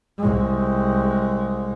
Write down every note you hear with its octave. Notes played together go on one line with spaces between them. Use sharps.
C2 G#3